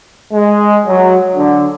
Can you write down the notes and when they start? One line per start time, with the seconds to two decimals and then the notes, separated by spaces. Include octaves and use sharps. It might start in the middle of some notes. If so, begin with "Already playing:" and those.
0.33 G#3
0.86 F#3
1.36 D3